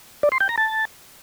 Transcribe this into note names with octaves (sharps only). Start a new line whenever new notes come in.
D5
C6
G5
A#5
A5